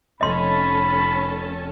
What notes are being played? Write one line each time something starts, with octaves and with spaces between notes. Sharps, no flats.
F1 C#4 A4 D#5 A5 B5 C6